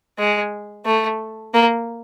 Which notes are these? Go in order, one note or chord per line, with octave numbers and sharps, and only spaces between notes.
G#3
A3
A#3